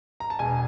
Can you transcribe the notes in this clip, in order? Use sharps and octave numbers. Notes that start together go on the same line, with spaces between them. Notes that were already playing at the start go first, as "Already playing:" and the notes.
A#5
A5
E1 G#5